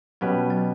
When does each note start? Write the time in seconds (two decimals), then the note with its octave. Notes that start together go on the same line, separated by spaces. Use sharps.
0.21 B2 F#3 G3 C#4 G4 B4
0.50 F#3